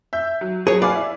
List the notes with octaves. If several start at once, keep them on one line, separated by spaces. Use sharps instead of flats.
E5 G6
F#3
F#3 G#4 C#5
B4 D5 F5 G#5
E4